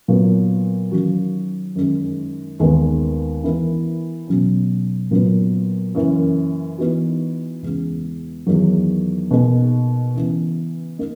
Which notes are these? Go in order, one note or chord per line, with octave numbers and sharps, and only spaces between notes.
A#2 F#3 B3
D#3 F#3 C#4 F#4
F#2 D#3 G#3
D#2 D#3 G#3 B3
E3 B3 E4 A#4
B2 F#3 C#4
A#2 F#3 B3
F#2 C#3 E3 A#3
E3 B3 D#4 F#4
E2 C#3 E3 G#3
E2 D#3 F#3
B2 A#3 D#4 G#4
C#3 E3 B3
A#3 D#4